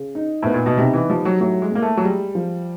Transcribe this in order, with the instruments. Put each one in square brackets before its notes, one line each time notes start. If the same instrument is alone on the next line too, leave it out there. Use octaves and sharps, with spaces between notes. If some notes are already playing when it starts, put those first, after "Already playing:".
Already playing: [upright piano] C#3
D#4
[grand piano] A2 [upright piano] B3
[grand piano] A#2
B2
[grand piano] C3 [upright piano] D#4
[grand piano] E3
[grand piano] F3 [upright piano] G3
[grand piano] F#3
[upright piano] A2 [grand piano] F#3
[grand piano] G#3
[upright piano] A2 [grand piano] A#3
[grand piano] A3
F#3
[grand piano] G3 [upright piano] G#3
[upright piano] F3